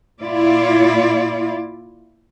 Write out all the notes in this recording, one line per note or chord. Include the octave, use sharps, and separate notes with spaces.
A#2 E4 F4 D5